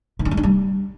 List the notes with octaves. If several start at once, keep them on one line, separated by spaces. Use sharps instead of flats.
D#3
C#4
G#3
D4
G3